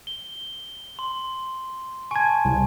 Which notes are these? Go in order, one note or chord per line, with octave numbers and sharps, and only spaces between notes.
G7
C6
G#5 A5 C#6 G#6
C2